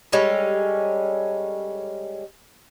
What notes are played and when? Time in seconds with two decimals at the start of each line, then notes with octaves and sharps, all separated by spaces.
0.12 G3 G#3 C#4 A4